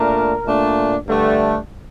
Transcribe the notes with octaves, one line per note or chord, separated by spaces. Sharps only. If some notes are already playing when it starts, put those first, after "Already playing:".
Already playing: A#2 A3 D4 A#4
A#2 A3 D4
G2 D3 A3 D4